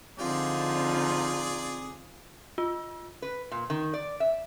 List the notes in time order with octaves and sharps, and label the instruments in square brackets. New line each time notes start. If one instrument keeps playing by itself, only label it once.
[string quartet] D3 F3 D#4 [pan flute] C4 [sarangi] F4 [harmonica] G#4 D5
[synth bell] F4
[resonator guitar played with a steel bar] B4
A#2
D#3
D5
E5